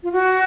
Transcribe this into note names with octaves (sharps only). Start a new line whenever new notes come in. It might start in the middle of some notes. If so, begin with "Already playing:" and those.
F4
F#4